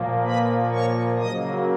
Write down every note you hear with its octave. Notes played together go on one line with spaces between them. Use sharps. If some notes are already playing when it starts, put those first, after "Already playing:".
Already playing: A#2 F3 A#3
B4 B5
C#5 C#6
C#3 F#3 A#3 D#5 D#6